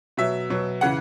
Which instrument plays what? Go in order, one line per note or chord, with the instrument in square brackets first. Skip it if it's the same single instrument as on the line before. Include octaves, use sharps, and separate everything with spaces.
[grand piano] B2 F#3 E5
B2 F#3
C#3 E3 F#5